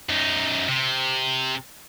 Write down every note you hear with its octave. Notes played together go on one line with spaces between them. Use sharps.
F#2 D#4
C3